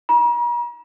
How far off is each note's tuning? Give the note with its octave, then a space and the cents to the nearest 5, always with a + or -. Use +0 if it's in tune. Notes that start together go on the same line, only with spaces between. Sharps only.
A#5 +45